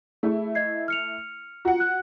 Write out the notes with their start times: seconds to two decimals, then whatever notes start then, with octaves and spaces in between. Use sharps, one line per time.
0.23 A3 E4 G#4
0.55 D#5 G#6 C7
0.88 F6 C#7 F7
1.65 F4 F#4 F#5
1.80 F#6